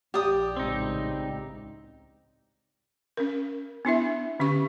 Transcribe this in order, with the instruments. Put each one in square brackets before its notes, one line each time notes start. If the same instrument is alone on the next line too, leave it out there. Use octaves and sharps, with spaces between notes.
[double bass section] A#1 [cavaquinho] G4 D5 D#6
[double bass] C#2 A2 [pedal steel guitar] C4 D#4
[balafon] C#4 A#4
B3 D4 E4 E5
D3 C#4 G4 C#6